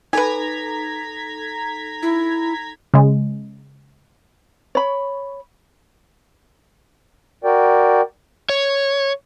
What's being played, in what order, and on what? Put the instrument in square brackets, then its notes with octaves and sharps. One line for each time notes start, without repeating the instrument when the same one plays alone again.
[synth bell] D#4 A4 [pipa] B4 G#5 [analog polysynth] A#5 G#6 B6
[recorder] E4
[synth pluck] C#3 G#3
[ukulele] C#5 B5
[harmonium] F#4 A#4 D5 G5
[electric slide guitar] C#5